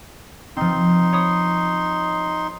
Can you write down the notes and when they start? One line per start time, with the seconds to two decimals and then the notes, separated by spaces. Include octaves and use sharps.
0.57 F3 C4 D#4 C6
1.13 C#5 B5 D#6